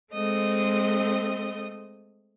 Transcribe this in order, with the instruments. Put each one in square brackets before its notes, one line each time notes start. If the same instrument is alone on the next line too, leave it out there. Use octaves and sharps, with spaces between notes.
[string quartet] G#3 A3 C4 D#5